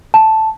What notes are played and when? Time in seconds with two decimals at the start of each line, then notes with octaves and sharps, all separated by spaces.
0.14 A5